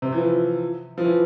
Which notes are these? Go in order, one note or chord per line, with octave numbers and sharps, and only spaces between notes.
C3
E3
F3
F3
E3